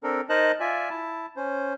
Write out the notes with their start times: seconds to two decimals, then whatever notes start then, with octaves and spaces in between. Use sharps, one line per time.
0.03 C4 D4 A4 A#4
0.29 D#4 A#4 C5 D#5 A5 F#6
0.60 F4 D5 E5 G#5
0.90 E4 A5
1.36 C#4 C5